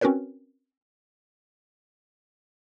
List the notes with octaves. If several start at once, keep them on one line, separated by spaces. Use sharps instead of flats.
C4 C#4 F#4 A#4 B4 C#5